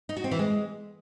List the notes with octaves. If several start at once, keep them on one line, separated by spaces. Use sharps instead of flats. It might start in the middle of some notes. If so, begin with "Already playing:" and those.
D#4
F#4
C4
E3
G#3